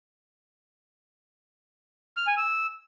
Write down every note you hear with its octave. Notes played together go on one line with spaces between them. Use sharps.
F6
G#5
E6